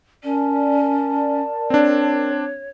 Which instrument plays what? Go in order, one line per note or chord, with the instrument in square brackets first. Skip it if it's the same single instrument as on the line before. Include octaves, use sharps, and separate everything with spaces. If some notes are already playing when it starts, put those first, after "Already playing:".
[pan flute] C#4 [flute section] A#4 D5 A5
[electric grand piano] C4 D4 [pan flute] C#5